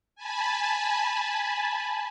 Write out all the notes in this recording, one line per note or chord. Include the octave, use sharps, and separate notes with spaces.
G#5 A5 B5